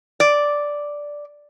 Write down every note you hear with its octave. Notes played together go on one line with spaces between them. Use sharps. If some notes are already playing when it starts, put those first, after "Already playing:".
D5